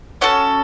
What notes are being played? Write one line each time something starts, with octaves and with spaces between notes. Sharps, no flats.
C#4 F#4 A4 F#5